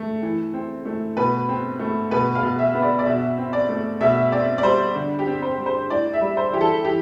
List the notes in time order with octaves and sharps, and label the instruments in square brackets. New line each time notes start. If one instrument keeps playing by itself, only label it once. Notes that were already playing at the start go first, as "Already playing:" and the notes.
Already playing: [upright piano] A3
E3
C4
A3
B2 B4
C4
A3
B2 B4
F5
B2
E5
B3
D5
D5
B2 E5
C4
D5
A3
B2 E5
C4 D5
D5
G3 C5
D3
G4
C4
C5
G3
C5
A2 D5
E5
G3
C5
E3 G4
A4
E3 G4